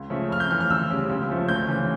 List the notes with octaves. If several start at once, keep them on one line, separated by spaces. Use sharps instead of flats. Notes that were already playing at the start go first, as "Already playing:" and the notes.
Already playing: C#2
C#3 F3 A3
F2 F6
G6
C#3 E3 A3 F6
F6
D2 E6
C#3 G3
C#2
C#3 F3 A3
D2 G6
C#3 E3